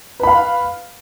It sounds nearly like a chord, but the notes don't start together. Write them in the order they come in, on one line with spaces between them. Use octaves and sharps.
B4 B5 F5